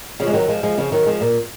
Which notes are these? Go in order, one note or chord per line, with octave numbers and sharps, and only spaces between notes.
C#3 F3
G#3
D#3 F#3
F3 G#3
F3 G#3
C#3 F3
D#3 F#3
F3 G#3
A#2